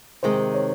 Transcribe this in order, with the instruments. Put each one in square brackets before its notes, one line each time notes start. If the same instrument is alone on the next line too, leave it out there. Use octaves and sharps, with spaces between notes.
[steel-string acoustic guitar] C3 D#3 G#3 [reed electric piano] C5
[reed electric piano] C#5